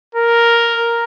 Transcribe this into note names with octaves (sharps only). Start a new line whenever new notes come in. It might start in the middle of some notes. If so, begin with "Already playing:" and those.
A#4